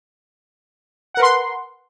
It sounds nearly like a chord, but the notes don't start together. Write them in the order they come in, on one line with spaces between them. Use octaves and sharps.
F#5 A#4 B4 C6